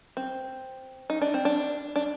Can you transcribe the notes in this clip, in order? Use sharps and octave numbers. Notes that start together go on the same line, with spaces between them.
C4
D#4
D4
C4
D4
D4